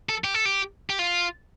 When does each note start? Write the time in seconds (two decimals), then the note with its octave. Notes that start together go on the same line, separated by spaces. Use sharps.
0.09 A4
0.24 G4
0.34 A4
0.45 G4
0.90 G4
0.99 F4